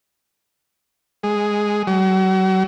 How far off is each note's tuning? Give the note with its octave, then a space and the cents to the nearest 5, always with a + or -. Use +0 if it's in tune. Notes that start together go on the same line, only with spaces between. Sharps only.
G#3 +0
F#3 +40